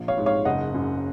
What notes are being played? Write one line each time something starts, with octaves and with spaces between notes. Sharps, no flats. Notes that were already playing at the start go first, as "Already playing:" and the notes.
Already playing: A#1
C#5 F5
G#2
C#5 F5
F#1 D#5 F#5
F#2